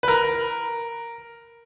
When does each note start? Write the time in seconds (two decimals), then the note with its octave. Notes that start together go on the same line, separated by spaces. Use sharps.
0.03 B4
0.08 A#4